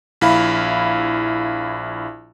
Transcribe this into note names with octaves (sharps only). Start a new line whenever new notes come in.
A#1 E4 F5 B5